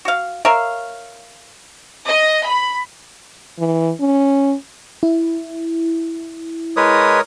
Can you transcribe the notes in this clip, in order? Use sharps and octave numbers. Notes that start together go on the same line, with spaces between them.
F#4 F5
A#4 C#5 E5 F5
D#5
B5
E3
C#4
E4
G#3 A#4 B4 C#5 D#6